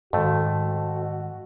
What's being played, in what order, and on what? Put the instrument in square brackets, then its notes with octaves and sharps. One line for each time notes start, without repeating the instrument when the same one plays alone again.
[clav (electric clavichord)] F2 A3 [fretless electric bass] G#2 D#3 [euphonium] F#4